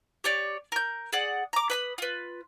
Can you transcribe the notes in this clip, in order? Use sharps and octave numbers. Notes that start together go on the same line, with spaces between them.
G4 C#5 D5
A#4 G6
G#4 D5 F#5
A#5 D6
B4 B5 D#6
F4 B4